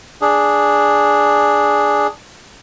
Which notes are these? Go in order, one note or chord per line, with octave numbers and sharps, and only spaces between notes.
D4 G#4